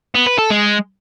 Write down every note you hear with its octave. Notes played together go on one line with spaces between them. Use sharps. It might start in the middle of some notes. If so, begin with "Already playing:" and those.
B3
B4
A4
G#3